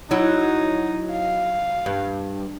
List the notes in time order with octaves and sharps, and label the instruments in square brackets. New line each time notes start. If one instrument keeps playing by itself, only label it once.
[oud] F#3 E4 [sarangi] D#4
[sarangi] F5
[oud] G2